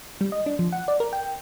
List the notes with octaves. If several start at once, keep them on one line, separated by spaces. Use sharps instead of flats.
G3
D#5
D4
F3
F#5
D5
A#4
G5